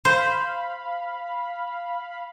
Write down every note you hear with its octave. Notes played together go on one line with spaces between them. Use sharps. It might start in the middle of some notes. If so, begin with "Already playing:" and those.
C5 F5 B5